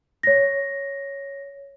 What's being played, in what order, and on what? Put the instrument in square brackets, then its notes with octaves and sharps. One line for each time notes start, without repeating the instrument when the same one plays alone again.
[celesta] C#5 A#6